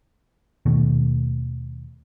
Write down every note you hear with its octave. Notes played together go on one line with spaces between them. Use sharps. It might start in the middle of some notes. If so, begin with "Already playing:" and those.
D#2 B2 D#3 A3